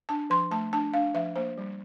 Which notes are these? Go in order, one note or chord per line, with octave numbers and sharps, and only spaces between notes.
D4 A5
F3 C6
A3 A5
D4 A5
D4 F5
F3 E5
A#3 C5
G3